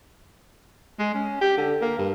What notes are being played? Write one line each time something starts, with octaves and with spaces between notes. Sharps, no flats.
G#3
C#4
G4
D3
A#3
G2